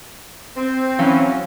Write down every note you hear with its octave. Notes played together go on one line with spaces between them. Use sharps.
C4
E3 F#3 C#4 F5